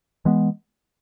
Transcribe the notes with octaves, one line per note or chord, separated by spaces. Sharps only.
E3 G#3 B3